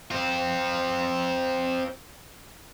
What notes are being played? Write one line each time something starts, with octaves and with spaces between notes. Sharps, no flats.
C4 F4